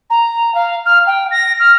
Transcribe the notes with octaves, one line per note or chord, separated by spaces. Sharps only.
A#5
F5
F6
G5
A#6
F6